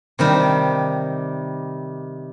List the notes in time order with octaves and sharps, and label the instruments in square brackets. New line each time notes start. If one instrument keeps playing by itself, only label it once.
[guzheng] C3 D#3 G3